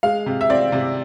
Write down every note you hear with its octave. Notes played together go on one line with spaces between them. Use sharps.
G#3 F5
C3
E5
C4 D5
C3